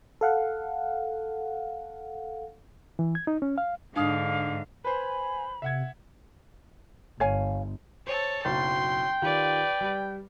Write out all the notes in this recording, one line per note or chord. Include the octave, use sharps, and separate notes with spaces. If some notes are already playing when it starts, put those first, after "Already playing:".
A4 F5 F#5
E3
G#6
D#4
C#4
F5
G#2 D3 D4 F5 D#6
B4 C5 G#5 B5
C3 E5 F#5 G#6
G1 C#5 F5 G#5
A4 C5 C#5
F#1 B1 F#3 G5 C6
D#3 F4 G4 B4 D5
G3